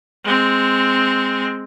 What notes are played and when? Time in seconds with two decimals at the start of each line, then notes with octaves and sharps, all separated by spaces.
0.24 G#3 C4